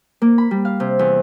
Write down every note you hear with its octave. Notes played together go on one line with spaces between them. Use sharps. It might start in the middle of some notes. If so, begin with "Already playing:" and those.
A#3
B5
G3
F5
C3
E2